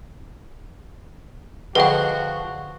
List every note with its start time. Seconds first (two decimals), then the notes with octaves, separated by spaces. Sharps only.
1.75 D3 F3 F#4 G#4 B4 D#5 F#5 G5